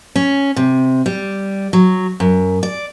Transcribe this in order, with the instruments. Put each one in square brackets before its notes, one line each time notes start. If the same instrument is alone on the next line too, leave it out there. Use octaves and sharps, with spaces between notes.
[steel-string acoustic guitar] C#4
C3
G3
F#3
F#2
D5